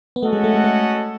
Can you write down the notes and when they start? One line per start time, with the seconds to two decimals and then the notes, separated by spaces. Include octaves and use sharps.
0.16 B3
0.22 A3 C#4 F#4 A4 D#5 F#5
0.33 G#3
0.44 A3
0.54 G#3
0.64 A3